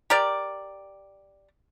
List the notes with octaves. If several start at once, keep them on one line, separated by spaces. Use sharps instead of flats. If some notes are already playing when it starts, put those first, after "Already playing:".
G4 A#4 D5